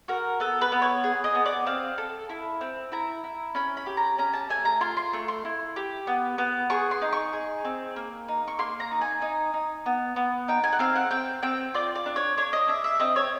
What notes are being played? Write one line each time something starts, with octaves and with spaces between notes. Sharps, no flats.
F#4 A#4
B3 A4
B4
B3
C#5
G#4
D#5
B3
D5
C4 F5
A4
E4
C4
E4 A#5
E4
C#4 B5
B5
G4
A#5
C#4 A#5
A5
A3 G#5
A#5
F4 C6
C6
A3 C#6
C6
E4
G4
B3
B3
G#4 C#6
C6
D#4
C#6
G#4
C4
A#3
D#4
C#6
A#3 C6
A#5
D#4
G#5
D#4
D#4
B3
B3
D#4 G5
G#5
F#5
C4 F5
F#5
C4 G5
C4 G5
F4 D5
D5
D4
C#5
D4 C#5
D#5
D4 E5
E5
C4 D#5
C#5